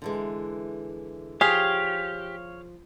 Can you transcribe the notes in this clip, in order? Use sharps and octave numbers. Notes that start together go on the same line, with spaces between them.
D3 E3 G#3
F3 G4 G#4 C#5 F5